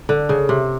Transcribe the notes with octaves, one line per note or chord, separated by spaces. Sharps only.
D3
C#3
C3